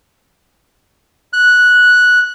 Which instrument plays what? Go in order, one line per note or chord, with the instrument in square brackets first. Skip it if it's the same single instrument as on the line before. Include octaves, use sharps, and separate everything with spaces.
[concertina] F#6